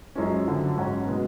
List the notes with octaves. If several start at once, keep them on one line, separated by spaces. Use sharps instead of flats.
F#2 F3 G#3 C#4
F#2 D3 F3
G#2 F#3 C#4 F#4
B2 G#3 B3